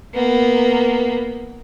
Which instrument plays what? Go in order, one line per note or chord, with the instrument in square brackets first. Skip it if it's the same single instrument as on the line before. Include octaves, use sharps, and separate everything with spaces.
[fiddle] A#3 B3